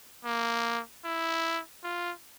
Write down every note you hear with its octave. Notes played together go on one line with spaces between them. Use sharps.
A#3
E4
F4